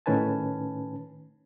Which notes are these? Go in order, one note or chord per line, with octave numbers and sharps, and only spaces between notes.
A2 D#3 C#4 B4 G#5 A5